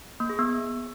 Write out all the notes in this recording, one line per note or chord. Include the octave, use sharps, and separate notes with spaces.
A#3
G#4
B3